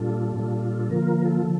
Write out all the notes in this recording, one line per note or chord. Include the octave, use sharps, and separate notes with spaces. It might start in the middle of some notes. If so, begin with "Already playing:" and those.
Already playing: A#2 G3 D4 F4 A4
A#2 G3 D4 F4
A4
D3 F3 A#3 F4 A#4
A#4
A4
D3 F3